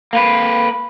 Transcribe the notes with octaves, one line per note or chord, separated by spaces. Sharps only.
A#3 B4